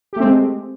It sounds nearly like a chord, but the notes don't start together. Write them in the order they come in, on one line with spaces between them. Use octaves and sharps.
G4 A3 C4 G#3